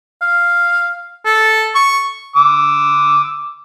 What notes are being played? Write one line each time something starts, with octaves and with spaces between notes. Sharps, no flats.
F5
A4
C#6
D6 E6